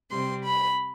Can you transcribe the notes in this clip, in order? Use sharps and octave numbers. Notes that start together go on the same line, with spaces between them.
C3 G3 C4 C6
B5